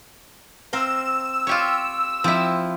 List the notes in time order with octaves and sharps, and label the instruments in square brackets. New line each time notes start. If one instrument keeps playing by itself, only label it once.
[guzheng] C4 F5 A#5 [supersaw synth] E6
[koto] F4 G4 C#5
[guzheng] F3 [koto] C4 E4